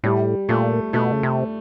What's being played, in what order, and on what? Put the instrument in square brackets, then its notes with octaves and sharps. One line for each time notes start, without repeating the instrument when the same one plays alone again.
[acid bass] A2 [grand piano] G3
[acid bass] A#2 [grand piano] A3
[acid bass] B2 [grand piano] A3
[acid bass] C#3
C3